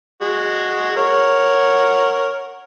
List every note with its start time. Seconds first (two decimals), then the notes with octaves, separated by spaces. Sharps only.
0.22 G#3 F#4
0.97 A#4 C#5 F#5